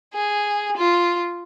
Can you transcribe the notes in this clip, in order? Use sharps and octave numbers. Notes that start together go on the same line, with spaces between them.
G#4
F4